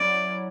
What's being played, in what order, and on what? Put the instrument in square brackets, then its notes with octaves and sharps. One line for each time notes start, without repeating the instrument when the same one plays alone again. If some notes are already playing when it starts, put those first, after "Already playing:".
Already playing: [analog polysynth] F#3 C#4 E4 [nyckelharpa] D5